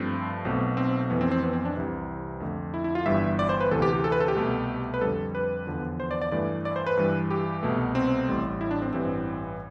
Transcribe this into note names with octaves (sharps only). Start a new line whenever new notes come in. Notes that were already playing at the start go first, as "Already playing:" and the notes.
Already playing: G2 F3 A3 C4
B1 B2 A3 C4
C4
F2 E3 A3 B3
C4
C4
B3
C4
D4
C2 C3 E3
F2 D3 A3
E4
E4
F4
G1 G2 E3 G3 E5
D5
C5
B4
D2 C3 E3 A4
G4
G4
A4
B4
A4
G4
C2 B2 A3
B4
F2 D3 G3 A4
B4
E2 D3 F3
C5
D5
D5
G2 E3 A3 D5
D5
C5
B4
G2 E3 G3
G4
C2 B2 A3
C4
A1 A2 G3
E4
D4
C4
A1 G2 E3 G3 C4